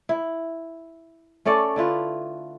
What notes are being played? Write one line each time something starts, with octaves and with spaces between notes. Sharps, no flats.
E4
A3 C#4 A4 D5
D3 E4 F4 B4